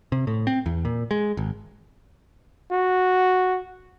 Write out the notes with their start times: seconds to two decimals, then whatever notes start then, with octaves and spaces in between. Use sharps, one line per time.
0.12 C3
0.27 A2
0.47 C4
0.66 E2
0.85 A#2
1.11 G#3
1.37 G#1
2.72 F#4